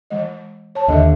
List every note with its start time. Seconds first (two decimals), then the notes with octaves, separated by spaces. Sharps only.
0.10 E3 G#3 D#5
0.75 C#5 A5
0.88 D#2 D3 D#5 E5